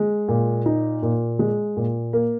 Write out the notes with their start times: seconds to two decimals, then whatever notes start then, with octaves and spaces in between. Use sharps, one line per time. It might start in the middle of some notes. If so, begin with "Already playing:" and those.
Already playing: G#3
0.28 A#2
0.66 D#4
1.02 A#2
1.39 G#3
1.77 A#2
2.13 A#3